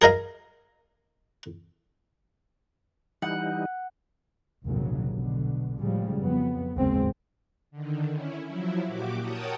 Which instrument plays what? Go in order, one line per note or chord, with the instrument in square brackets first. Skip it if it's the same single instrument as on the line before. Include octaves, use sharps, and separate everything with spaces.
[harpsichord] G#4 A#4 D#5 F5
[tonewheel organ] E3 G3 D#4 [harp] F#5
[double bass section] F1 A#1 D#2 G#2 C#3 F#3
B1 B2 D3
A2 C#3 F3 G3 G#3
F2 F#3 B3
G#1 D#2 C#3 G#3 C4
[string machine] D3 D#3
C#4 E4
F3 F#3 E4
A#2 F#4 G4 D6
A#4 C#5 F#5 G5 A5 D#6